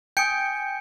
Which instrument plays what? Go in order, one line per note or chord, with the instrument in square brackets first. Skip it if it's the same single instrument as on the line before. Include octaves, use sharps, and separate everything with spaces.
[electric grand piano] G5 G#5 D#6 [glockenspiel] G6 C#7 D7